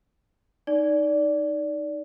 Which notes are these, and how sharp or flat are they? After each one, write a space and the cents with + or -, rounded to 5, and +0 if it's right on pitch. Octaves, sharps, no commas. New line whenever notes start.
D#4 -5 D5 -15